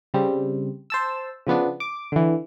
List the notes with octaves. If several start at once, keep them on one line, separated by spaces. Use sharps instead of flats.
C#3 G3 C4
C5 A5 E6
C#3 F3 B3 D4
D6
D3 E3